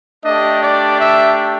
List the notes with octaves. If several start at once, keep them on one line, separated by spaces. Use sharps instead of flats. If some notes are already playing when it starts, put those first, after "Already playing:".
A3 D4 G4 D#5
D5
E5